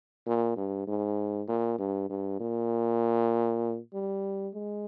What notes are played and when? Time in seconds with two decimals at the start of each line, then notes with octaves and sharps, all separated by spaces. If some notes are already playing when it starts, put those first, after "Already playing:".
0.26 A#2
0.56 G2
0.87 G#2
1.48 A#2
1.79 G2
2.10 G2
2.40 A#2
3.94 G3
4.54 G#3